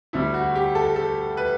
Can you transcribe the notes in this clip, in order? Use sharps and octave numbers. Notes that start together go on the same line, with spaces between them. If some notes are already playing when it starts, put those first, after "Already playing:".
D2 D3 G3 E4
F#4
G4
A4
A4
B4